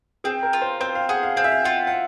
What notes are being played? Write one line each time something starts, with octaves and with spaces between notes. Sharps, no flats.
C4 G#4
A#4
F4
C5
C4 C5
F5
G#4 F#5
F5
C4 F5
E5
F5
F4 F#5
F#5